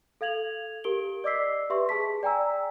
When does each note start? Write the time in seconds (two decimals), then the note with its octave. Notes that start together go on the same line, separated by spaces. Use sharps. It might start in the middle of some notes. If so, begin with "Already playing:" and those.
0.21 A4 F5 G#6 F7 F#7
0.84 G4 A#4 D7 G7
1.24 D5 D#5 D6 E6 B6 C7
1.70 G4 B4 E5 C6 C#6
1.89 G#4 A5 B6
2.23 D5 G5 G#5 A#5 E6